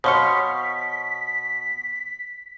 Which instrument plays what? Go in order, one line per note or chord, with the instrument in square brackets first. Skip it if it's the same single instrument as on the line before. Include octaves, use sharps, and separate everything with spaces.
[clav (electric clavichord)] B2 [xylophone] C5 C6 C#7 [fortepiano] C#5 F5 F6 [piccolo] B6